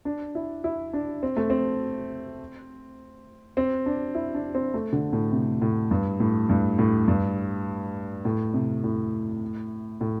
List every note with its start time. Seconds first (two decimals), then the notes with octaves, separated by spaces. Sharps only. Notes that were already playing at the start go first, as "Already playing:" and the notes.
0.05 D4
0.35 E4
0.64 E4
0.93 D4
1.23 C4
1.37 A3
1.50 C4
3.57 C4
3.86 D4
4.15 E4
4.35 D4
4.55 C4
4.74 A3
4.93 D3
5.13 A2
5.32 C3
5.62 A2
5.91 G2
6.20 A2
6.49 G2
6.78 A2
7.08 G2
8.25 A2
8.54 C3
8.84 A2
10.01 A2